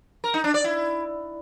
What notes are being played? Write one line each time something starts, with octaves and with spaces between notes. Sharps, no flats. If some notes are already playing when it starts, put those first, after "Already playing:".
A#4
D#4
D4
D5
E4